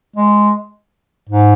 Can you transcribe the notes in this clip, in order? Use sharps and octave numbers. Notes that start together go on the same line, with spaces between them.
G#3
G#2